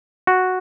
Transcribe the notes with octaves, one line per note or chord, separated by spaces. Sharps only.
F#4